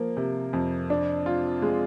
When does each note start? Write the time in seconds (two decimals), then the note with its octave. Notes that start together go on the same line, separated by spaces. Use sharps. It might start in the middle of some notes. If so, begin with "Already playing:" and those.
Already playing: F3 A#3
0.17 C3
0.53 F2
0.90 D4
1.26 F4
1.62 G#3